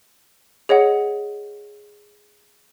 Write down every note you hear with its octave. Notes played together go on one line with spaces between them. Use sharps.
G#4 C#5 D#5 F#5